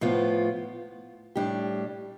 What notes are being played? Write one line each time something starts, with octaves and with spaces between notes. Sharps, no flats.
A2 F3 B3 F4
A2 G3 D4 G4